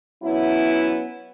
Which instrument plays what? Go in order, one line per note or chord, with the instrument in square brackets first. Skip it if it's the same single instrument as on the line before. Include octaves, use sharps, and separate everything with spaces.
[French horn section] F#3 B3 C#4 E4